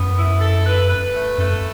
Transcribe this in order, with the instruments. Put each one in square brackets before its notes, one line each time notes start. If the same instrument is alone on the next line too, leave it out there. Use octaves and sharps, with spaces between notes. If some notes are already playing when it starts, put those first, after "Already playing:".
Already playing: [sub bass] F#2 [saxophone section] B3
[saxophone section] E4
A4
B4
B4
A3
[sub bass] F#2 [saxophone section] A3